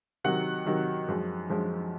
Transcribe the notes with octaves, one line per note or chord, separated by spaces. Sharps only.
C3 D#3 F#3 F#5
C3 D#3 F#3
F#2 F3 G#3
F#2 F3 G#3